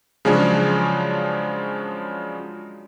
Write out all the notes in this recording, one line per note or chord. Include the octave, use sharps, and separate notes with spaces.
C#3 F3 F#3 G#3 C#4 D4